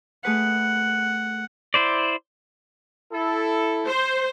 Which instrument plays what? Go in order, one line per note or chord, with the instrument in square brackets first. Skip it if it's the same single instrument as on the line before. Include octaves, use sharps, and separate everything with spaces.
[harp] A3 G#4 B4 [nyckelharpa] F#5
[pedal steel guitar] E4 C5 D5
[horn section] E4 A4
[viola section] C5